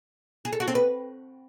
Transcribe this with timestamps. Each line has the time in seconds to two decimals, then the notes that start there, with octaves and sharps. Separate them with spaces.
0.45 G#4
0.53 A4
0.60 F#4
0.68 C4
0.75 B4